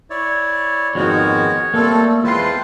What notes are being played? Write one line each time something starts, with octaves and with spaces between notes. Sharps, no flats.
E4 C#5 D5
F2 G#2 D#3 G#3 B3 F#4 C#5
G3 A3 A#3 C4 A4
E2 G#3 C4 F4 B4 A5 C6